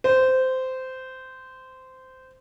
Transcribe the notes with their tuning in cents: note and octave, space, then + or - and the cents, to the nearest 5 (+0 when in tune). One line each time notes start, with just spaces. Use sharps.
C5 -15